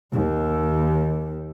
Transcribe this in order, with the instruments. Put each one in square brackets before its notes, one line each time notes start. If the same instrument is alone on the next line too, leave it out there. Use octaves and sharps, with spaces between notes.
[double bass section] D#2